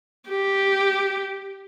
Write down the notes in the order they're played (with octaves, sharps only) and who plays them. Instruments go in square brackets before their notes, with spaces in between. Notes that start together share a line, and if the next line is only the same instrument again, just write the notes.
[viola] G4